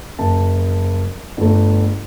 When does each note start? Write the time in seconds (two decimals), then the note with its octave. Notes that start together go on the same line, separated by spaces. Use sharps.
0.19 F#1 A5
1.37 G1 A3